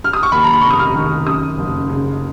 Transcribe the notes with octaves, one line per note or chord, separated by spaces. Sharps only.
F6
D#6
C#6
D#2 B5
A#5
B5
F1 C#6
D#6
F6
D#3
F#2 D#6
F#1
C#3